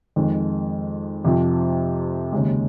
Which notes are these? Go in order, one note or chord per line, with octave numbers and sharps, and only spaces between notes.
F2 D#3 G#3
F2 C3 F3
D#2 C#3 G#3